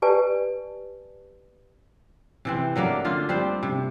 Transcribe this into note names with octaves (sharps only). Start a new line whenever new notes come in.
G4 B4 D5 G#5 A5
C3 E3 C4
F#3 A3 A#3 D4
D3 D4 F4
G3 C4 D4 C5
C3